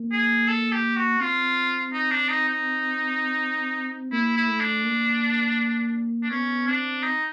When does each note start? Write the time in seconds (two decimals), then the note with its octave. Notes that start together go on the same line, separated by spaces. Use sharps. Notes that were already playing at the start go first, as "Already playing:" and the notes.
Already playing: A#3
0.12 G#4
0.48 A4
0.72 G4
0.96 F#4
1.20 C4 F4
1.93 D#4
2.12 D4
2.31 D#4
2.48 D#4
4.12 A#3 E4
4.37 E4
4.49 A3
4.60 D4
4.84 A#3
6.23 D4
6.30 B3 C#4
6.67 C4 D4
7.03 D#4